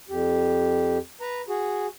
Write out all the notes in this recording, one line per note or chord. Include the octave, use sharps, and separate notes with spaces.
F2 G4
B4 A#5
F#4 G#4